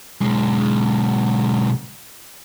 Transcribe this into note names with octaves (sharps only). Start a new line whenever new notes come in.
B1 G#3